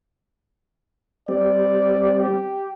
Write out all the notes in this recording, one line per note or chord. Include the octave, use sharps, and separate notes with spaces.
G3 C4 D5
G4